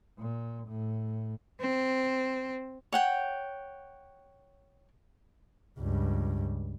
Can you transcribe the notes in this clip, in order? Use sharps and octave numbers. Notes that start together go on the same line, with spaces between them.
A#2
A2
C4
C#5 F#5 G5
C#2 G2